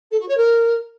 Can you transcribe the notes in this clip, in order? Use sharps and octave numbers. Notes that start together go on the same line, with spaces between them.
A4
F#4
C#5
A#4